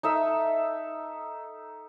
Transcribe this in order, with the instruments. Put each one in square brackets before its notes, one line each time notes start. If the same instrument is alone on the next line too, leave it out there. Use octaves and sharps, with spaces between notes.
[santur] D#4 A4 E5